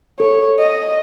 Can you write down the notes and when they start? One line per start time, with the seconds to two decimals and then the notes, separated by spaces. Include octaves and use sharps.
0.20 A4 C#5
0.59 D#5